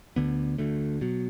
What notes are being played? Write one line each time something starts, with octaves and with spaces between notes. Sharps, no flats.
D2 D3 B3
D2 D3 A3
B2 F#3